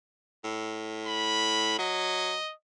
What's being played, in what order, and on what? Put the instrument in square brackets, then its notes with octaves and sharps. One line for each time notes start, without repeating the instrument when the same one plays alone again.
[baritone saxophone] A2
[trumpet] B5
[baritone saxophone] F#3 [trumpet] D#5